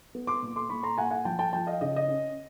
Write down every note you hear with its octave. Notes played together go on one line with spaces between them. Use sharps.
B3
C6 D6
A#2
C6 D6
A#2 B5 C#6
A#5 C6
A#2 F#5 G#5
F#5 G#5
F3 G5 A5
G5 A5
F3 G5 A5
D#5 F5
C#3 D#5
D#5
C#4